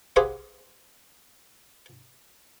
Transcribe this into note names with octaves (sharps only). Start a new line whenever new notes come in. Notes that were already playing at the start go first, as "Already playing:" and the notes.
G4 G#4 B4 C5 F5 F#5